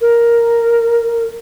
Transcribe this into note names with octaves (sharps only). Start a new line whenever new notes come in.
A#4